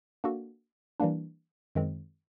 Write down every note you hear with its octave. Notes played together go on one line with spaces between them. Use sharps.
A#3 D4 F#4 A4
E3 G3 A#3 D4
F#2 D#3 G#3 C4